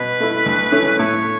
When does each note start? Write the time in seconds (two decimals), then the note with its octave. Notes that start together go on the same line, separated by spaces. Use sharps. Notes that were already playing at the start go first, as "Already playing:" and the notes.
Already playing: B2 B4
0.20 A3 E4
0.46 D2
0.72 D3 A3 C#4 E4
0.98 A2 C#5